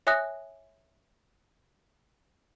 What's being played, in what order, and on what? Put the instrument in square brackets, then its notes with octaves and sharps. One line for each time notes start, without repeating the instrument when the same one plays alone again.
[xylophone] C#5 E5 G#5 D#6 F#6 A#6